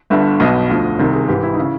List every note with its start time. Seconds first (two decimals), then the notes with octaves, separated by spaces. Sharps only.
0.10 G1 G2 D3 E5
0.40 B1 B2 D#5
0.70 D2 D3 F3
0.99 C2 C3 D#3
1.13 G#4
1.28 G#1 G#2 E3 G4
1.43 E4
1.53 D#4
1.57 C#3 E4